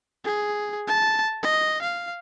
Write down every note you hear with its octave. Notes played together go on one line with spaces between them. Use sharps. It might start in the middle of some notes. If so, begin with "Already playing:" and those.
G#4
A5
D#5
F5